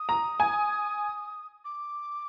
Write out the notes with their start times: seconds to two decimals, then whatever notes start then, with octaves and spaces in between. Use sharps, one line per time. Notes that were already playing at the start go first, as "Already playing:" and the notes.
Already playing: D#6
0.09 A#5
0.40 G#5
1.65 D6